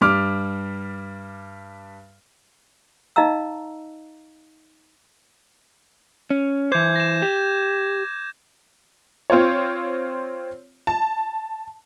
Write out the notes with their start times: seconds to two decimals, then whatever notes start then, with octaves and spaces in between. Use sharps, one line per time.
0.01 G2 G3 D6 F6
3.16 D#4 D#5 F5 A#5 E6
6.30 C#4
6.72 E3 C5 D6 G6 G#6
6.96 A#6 E7
7.22 G4
9.30 C4 F4 C5 C#5
10.87 A5